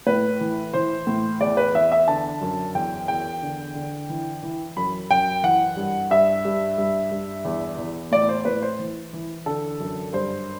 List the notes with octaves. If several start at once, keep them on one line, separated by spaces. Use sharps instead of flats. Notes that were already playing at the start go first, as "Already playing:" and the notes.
A2 B4
E3
E3 C5
A2
E2 D5
B4
E2 E5
E5
D3 A5
F#2
E2 G5
E2 G5
D3
D3
E3
E3
F#2 B5
F#2 G5
E3 F#5
G2
G2 E5
G2
G2
G2
E2
E2
A2 D5
C5
A2 B4
C5
E3
E3
D3 A4
F#2
G2 C5